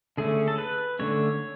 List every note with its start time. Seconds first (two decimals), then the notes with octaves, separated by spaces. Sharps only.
0.17 D3 A3 C#4 G#4
0.48 A4
0.58 B4
0.99 D3 A3 C#4 C#5